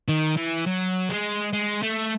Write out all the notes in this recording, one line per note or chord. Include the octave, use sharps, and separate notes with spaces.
D#3
E3
F#3
G#3
G#3
A3